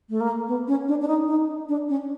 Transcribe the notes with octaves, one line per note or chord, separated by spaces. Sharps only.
A3
A#3
B3
C#4
D4
D4
D#4
D#4
D4
C#4